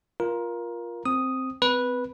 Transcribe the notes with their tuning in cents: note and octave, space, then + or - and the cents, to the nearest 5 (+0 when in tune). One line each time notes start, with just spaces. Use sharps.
F4 +0 A#4 +20
C4 +0 D#6 +0
C4 -35 B4 -10